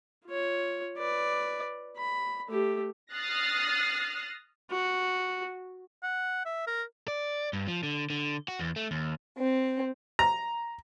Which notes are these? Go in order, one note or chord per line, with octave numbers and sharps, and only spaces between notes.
F4 C#5
B4 D5
B5
A3 G4
D#6 F6 F#6 A6 A#6 C7
F#4
F#5
E5
A#4
D5
G2
F3
D3
D3
F#4
E2
A3
D#2
C4
A#5